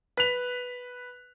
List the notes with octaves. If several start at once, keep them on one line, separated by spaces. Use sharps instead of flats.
B4 F#6 B6 F7